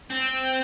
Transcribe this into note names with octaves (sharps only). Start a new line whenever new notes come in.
C4